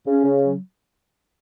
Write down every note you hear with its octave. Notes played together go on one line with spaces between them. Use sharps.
C#3 C#4
C#3
F#3